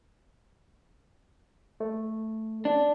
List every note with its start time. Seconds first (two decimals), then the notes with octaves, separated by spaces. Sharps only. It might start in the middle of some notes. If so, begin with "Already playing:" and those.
1.80 A3
2.65 D4